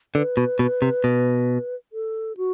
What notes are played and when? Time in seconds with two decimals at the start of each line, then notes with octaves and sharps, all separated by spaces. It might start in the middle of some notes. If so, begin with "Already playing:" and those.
0.15 D3 B4
0.37 B2
0.59 B2
0.82 C3
1.04 B2
1.93 A4
2.37 F#4